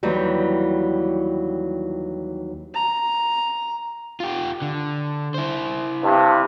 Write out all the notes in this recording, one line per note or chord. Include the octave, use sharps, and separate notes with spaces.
D#2 E3 F#3 G3
A#5
F4 G4
D3
E4 C5
G2 C3